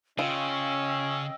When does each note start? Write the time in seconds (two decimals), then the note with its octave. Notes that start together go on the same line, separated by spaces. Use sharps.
0.19 C#3 C#4 F4 D#5 G5 E6